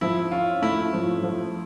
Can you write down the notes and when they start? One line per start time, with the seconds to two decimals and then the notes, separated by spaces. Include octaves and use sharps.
0.01 F3 E4
0.31 C#4 F4
0.62 A3 E4
0.93 F3
1.23 F3